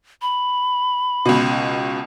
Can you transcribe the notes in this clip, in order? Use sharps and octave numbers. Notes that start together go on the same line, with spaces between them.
B5
C#2 B2